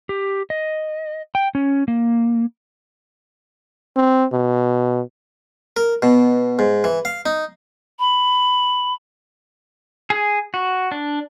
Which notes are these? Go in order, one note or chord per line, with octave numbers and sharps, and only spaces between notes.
G4
D#5
G5
C#4
A#3
C4
B2
A#4
B2
G#2
E3
F5
D#4
B5
G#4
F#4
D4